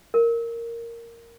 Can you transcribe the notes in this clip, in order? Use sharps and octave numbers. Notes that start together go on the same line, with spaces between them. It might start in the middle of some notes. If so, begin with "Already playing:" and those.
A#4